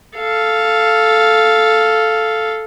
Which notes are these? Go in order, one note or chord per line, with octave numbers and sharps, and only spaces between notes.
A4 F5